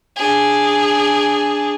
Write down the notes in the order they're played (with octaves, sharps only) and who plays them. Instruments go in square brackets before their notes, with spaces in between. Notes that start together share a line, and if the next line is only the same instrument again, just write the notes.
[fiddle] D4 G#4